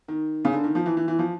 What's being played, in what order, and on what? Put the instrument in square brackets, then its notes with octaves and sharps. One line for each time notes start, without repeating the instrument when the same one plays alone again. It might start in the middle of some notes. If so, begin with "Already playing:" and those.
[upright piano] D#3
C#3
D3
D#3
F3
E3
E3
E3
F3